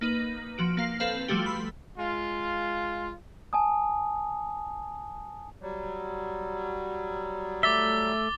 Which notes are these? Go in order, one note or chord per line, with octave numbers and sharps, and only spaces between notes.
A#3 D#4 B4
F3 F#4 D7
A#3 F5 C7
C4 A4 B4 F5
F3 G3 A3 F#4 G4
B5 C6 E6
G#3 F4
G#5 A5 D#6
F#3 G3
A3 E5 D6 A6 G7